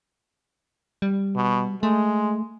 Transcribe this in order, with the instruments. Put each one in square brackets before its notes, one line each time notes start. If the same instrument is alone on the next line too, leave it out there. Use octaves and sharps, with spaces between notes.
[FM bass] G3
[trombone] B2
[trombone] G#3 [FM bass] A3